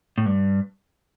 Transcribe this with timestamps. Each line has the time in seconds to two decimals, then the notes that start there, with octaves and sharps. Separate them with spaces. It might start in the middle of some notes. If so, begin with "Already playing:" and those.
0.18 A2
0.26 G2